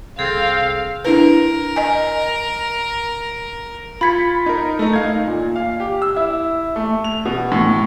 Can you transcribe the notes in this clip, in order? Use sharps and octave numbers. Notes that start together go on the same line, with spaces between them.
C2 C4 G#4 A4 F5
D4 E4 A#4 B4
D#5 G#5
F4 B5 G#6 B6 C#7
D#4 A#4
A3 D#4
D#4 F5 G#6
A#2
F5
G4
E6
E4
A3
F7
B2
A2